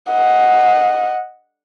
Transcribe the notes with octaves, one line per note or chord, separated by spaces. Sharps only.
D#5 F#5